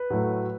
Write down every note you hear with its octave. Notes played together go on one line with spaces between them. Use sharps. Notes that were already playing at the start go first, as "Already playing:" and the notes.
Already playing: B4
A2 F#3 A3